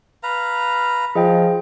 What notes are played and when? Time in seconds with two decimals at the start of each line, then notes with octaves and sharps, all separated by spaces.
0.23 B4 F5 A#5
1.15 F3 G#4 D#5 G5